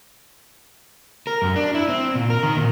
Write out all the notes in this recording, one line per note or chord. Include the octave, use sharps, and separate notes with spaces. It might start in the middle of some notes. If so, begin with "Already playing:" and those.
A#4
F#2
D4
E4
C4
A#2
A#4
D#3
A#2